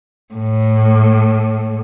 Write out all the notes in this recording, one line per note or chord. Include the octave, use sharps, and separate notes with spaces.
A2